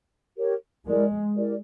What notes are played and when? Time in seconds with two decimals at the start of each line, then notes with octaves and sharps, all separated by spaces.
0.36 G4 A#4 C#5
0.86 G#3 E4 G4 A#4 D5
1.36 E4 G4 A#4 D5